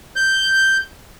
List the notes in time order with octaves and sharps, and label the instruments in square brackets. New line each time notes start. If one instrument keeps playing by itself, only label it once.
[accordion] G6